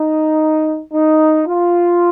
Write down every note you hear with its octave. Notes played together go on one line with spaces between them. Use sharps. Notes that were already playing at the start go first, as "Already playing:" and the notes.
Already playing: D#4
D#4
F4